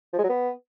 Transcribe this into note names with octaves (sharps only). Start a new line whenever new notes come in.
F3
G#3
F#3
B3